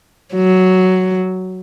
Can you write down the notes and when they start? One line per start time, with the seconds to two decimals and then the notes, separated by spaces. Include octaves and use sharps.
0.35 F#3